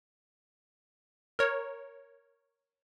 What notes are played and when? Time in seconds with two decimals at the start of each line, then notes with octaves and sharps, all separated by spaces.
1.39 A#4 C#5